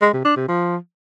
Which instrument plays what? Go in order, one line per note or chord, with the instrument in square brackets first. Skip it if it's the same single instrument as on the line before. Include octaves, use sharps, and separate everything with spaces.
[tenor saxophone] G#3
C3
D4
C3
F3